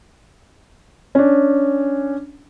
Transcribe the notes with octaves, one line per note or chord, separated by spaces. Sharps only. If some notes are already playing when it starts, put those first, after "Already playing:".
C#4 D4